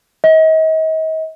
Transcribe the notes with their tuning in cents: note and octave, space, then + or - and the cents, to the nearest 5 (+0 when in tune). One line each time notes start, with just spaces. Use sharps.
D#5 +40